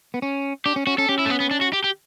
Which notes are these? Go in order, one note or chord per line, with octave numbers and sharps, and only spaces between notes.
B3
C#4
D4 G4
C#4
C#4 F#4
C#4 A4
C#4 G4
E4
A3
B3
B3
D4
F#4
G4
G4